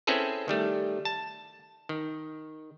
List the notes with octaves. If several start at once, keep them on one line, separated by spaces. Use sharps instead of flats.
C4 C#4 E4 G#4 A4 B4
D#3 G3 A3
A5
D#3